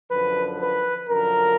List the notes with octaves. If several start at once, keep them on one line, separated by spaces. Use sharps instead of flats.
F#2 D3 F3 B4
B4
F#2 D3 F3 A#4